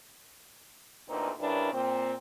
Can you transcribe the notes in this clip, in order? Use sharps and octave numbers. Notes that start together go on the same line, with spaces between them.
D2 A#2 D3 C4 D#4 B4
C#3 G3 D4 E4 A#4 B4
A#2 C4